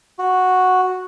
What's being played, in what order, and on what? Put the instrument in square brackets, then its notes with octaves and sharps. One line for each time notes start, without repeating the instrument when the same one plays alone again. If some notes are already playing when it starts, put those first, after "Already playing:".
[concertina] F#4